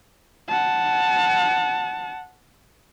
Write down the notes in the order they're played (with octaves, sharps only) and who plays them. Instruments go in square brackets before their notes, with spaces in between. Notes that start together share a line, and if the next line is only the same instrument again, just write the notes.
[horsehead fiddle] F#5 A5